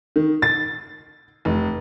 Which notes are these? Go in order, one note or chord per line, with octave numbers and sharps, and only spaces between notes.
D#3
A6
F1